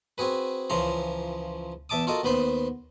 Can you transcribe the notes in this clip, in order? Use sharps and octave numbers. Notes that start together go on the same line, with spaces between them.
C4 F#4 G#4 B4
C#2 C#3 E3 F3 A#5 C6
E2 E5 A5 D6 D#6
F4 F#4 A4 A#4 D#5
D#2 B3 B4 C5 C6